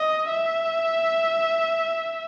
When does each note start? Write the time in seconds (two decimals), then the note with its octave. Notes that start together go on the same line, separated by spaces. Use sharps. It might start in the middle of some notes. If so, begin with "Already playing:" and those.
Already playing: D#5
0.30 E5